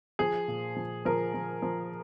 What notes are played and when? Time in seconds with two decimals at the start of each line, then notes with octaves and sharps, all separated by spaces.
0.19 F3 G#4
0.48 A#2
0.76 F3
1.05 F3 A#4
1.34 F3
1.62 F3